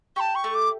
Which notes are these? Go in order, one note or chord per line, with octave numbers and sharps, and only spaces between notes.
G4 A5 C#6
C#6
A3
D6